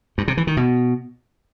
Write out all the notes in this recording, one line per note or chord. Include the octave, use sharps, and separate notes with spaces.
G2
C3
E3
D#3
B2